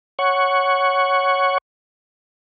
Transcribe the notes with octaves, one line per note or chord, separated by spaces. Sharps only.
C#5 F#5 C#6